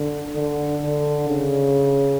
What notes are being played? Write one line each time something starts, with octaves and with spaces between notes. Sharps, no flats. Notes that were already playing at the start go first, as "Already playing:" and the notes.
Already playing: D3
D3
D3
C#3